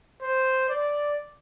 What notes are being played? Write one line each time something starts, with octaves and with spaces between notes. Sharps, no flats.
C5
D5